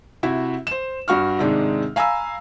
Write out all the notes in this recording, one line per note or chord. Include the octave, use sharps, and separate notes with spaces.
C3 E4 F#4 E5
C5 E7
G2 F#4 C#6 F6
G#2 C3 D#3 G#3 D4
F5 G#5 A#5 B5 E6